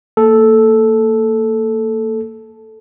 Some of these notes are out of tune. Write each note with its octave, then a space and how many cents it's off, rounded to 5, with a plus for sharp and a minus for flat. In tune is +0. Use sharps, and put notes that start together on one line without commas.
A#3 -30 A4 -5